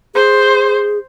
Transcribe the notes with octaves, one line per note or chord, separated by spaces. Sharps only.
G#4 C5